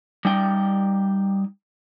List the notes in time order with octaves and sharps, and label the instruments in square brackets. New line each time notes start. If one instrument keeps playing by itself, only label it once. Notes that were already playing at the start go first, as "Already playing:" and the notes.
[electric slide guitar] G3 D#4 G5